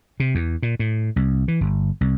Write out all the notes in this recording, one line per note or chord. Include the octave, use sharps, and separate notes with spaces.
C3
E2
A#2
A2
C2
E3
G1
C2